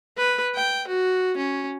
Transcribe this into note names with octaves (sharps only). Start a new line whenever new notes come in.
B4
G5
F#4
C#4